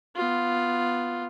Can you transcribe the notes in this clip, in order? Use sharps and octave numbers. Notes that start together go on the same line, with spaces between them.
B3 F4